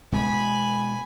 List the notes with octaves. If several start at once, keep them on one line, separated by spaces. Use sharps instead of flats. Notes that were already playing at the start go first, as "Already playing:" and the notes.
B2 G#3 B3 G#5 B5